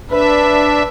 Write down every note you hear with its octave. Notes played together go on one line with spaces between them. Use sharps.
D4 B4 E5